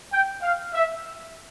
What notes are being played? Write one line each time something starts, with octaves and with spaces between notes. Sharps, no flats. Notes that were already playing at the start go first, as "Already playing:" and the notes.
G5
F5
E5